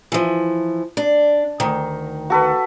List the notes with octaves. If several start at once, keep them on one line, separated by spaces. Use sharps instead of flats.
E3 F3
D4
D2 D#3
F#4 A4 B4